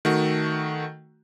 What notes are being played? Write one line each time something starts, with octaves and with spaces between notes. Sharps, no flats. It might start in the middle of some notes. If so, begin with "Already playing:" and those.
D#3 A3 F#4